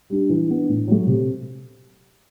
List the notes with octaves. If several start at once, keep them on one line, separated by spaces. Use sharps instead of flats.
G3 D4
E3
B3 D4
A2
F#3 A3
C3